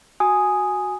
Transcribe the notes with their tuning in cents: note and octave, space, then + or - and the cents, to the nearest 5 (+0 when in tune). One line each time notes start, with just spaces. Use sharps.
F#4 +0 G#5 +0 D#6 +0